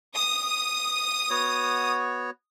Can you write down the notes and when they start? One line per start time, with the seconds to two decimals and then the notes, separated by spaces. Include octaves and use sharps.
0.16 D#6
1.30 B3 F#4 C#5